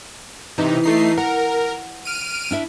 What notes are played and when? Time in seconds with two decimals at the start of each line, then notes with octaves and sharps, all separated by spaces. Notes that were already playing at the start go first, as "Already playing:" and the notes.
0.58 C3 E3 D#4
0.84 A3 D#4 C7
1.17 A#4 F#5
2.05 F6 D7 D#7
2.51 D4 E4 E5